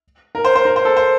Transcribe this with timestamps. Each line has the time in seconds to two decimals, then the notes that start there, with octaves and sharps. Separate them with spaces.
0.35 A#4
0.44 C5
0.55 C5
0.65 A#4
0.76 C5
0.85 A4
0.97 C5